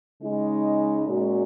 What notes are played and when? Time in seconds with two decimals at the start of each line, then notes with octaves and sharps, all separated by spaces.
0.19 C#3 G#3 D#4
1.06 A#2 G#3 C#4 F#4